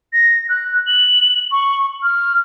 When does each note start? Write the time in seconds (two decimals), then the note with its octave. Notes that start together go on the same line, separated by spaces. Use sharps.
0.13 A#6
0.49 F#6
0.87 F#7
1.52 C#6
2.03 F6